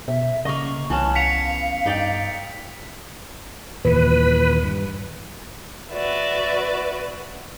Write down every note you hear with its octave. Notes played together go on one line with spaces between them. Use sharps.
B2 E5
C#3 A#3 D#5 C#6
C2 E3 B3 C#4 A5
F5 B6 C#7 F7
G2 D#4 D5 G5
D#2 A#2 E3 B4
G2
F#4 B4 D5 E5